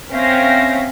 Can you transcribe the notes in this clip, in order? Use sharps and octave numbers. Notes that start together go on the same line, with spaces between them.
C4 C#4 E5 F5 G5 A#6